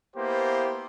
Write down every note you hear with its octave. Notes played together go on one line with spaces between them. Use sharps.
A#3 B3 E4 G4 C5